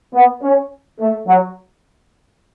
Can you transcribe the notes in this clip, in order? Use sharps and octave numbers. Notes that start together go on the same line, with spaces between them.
B3
C#4
A3
F#3